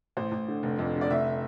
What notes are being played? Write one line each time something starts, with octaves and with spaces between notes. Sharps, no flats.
A1 C5
A1
D3
F1
F2
D3
D5
F1 E5